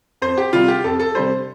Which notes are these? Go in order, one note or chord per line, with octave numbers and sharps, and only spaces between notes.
F2 C5
G4
C3 G3 F4
G4
F2 A4
A4
C3 G3 C5